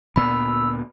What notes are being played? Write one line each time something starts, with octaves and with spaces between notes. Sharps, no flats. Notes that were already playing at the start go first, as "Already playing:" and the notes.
D2 A#2 B3 B5 E6